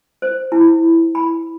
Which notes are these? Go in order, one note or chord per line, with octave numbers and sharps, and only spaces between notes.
C5
E4
B5